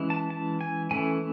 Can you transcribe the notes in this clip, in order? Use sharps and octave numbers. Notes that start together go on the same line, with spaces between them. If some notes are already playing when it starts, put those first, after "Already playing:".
Already playing: E3 G#3 C#4 E4
A5
A5
G#5
E3 A3 C#4 E4 G#5